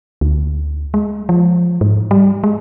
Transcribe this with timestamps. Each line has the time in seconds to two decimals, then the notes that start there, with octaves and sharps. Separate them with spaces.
0.21 D2
0.94 G#3
1.29 F3
1.81 G#2
2.11 G3
2.44 G#3